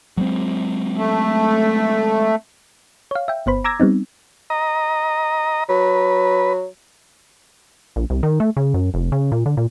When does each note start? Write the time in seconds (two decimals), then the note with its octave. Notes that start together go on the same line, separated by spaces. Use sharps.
0.17 F#3 G#3 C4
0.97 A3
3.11 C#5 F5
3.28 E5 G5
3.46 G1 B3 C5 B5
3.64 A#5 D6 E6 G#6 A#6
3.80 G3 B3 C4 D#4
4.50 D#5 A#5
5.69 F#3 B4
7.96 A#1
8.10 C2
8.23 D#3
8.40 A3
8.57 C#3
8.74 F#2
8.94 F1
9.12 C#3
9.32 A#2
9.46 D3
9.57 A#2